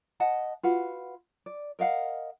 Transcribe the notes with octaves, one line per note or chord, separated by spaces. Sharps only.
D#5 F#5 A5
F4 F#4 B4 F#5
D5
A#4 D#5 F5 F#5